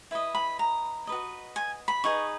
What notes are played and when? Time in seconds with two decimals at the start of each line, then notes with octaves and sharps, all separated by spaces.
0.11 E4 B4 D#5
0.35 B5
0.59 A#5
1.07 F#4 B4 D#5
1.56 G#5
1.88 B5
2.04 D#4 G#4 B4 D#5 C#6